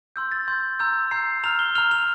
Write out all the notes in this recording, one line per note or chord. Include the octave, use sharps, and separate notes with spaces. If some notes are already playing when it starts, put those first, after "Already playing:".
C6 E6 G6
A6
C6 E6 G6
A#5 E6 G6
A#5 E6 G6 C7
A#5 F6 F7
G7
A#5 F6 F7
F7